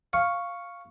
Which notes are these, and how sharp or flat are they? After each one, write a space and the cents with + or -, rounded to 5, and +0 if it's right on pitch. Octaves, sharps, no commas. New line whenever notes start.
F5 +0 C#6 +0